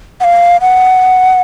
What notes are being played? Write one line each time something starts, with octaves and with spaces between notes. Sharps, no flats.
F#5
F5
F#5